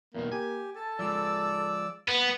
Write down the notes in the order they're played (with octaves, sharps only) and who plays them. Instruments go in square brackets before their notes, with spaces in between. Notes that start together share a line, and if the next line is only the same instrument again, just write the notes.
[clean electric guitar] E2 B2 D#3 [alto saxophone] A#3
[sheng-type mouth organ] G4 [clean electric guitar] G#5
[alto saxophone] A4 [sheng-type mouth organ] A5
[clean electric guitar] F3 G#3 [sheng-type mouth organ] D5 E6
[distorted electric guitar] B3 [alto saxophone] B4